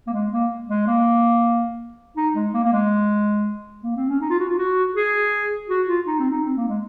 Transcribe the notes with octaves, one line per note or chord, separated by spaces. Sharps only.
A#3
G#3
A#3
G#3
A#3
D#4
G#3
A#3
A#3
G#3
A#3
C4
C#4
D#4
F4
F#4
F4
F#4
G#4
F#4
F4
D#4
C4
D#4
C4
A#3
G#3